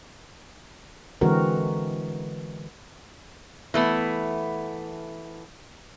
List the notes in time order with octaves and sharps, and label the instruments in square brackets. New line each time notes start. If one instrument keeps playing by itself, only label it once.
[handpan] D3 E3 G#3 C4 F#4 A#4
[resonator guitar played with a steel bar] E3 A3 B3